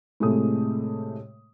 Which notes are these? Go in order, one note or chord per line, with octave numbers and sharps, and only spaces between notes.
A2 C3 G#3 A3 D#6